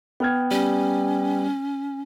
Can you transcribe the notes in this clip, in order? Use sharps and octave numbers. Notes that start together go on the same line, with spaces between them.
B3 G5 F6 G#6
G3 C#4